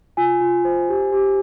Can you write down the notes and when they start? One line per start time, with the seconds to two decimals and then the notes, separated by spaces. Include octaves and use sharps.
0.17 F4 G#5
0.41 F4
0.65 C5
0.89 G4
1.12 G4